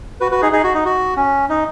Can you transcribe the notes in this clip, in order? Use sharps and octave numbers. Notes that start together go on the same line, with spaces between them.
F#4 B4
F#4 B4
D#4 G#4
D#4 G#4
F#4
D#4
F#4
C#4
D#4